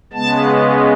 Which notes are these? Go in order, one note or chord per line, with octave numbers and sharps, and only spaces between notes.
C#3 G#3 B3 A5